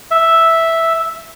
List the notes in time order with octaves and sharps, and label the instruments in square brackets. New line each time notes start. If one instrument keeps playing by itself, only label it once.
[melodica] E5